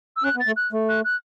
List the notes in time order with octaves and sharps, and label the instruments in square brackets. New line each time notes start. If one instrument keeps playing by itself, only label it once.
[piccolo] E6
[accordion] C#4 [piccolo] F#6
[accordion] B3
[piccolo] A6
[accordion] A3
[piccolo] F#6
[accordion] A3
[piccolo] F#6
F#6